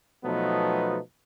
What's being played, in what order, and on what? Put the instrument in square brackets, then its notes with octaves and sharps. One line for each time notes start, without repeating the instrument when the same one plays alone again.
[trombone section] B2 F3 F#3 A3 B3 D#4